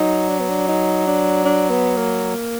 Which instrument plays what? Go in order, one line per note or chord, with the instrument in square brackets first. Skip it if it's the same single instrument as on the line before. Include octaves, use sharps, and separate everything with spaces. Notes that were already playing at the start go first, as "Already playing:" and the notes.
Already playing: [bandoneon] F#3 [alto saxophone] D#4
[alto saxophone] D4
B3
D4
D#4
D4
D4
B3
A#3